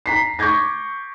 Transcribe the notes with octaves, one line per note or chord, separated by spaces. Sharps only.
A#5 B6 C7
C#6 D6 G6 G#6 A#6